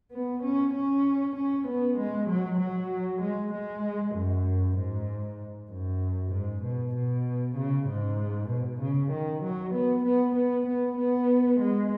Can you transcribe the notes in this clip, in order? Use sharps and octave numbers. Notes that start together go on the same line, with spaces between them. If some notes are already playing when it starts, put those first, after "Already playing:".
B3
C#4
C#4
C#4
B3
G#3
F#3
F#3
G#3
G#3
F#2
G#2
F#2
G#2
B2
B2
C#3
G#2
B2
C#3
D#3
F#3
B3
B3
B3
B3
B3
G#3